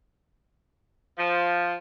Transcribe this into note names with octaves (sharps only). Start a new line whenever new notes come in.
F3